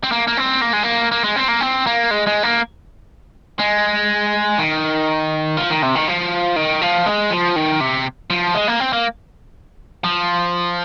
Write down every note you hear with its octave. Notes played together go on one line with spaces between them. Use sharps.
C4
A#3
A#3
C4
A#3
G#3
A#3
A#3
G#3
C4
A#3
C4
A#3
G#3
G#3
A#3
G#3
D#3
F3
D#3
C3
D#3
F3
D#3
F3
G#3
F3
D#3
C3
F3
G#3
A#3
C4
A#3
F3